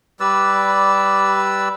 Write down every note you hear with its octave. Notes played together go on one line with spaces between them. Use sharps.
G3 B4 D5 E6